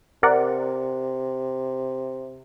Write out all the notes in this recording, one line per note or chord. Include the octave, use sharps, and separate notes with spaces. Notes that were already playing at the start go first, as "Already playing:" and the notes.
C3 A#4 D5 F#5